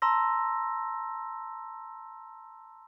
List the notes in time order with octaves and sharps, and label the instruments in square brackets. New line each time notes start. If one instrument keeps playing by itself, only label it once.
[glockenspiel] A5 A#5 C6 E6 A#6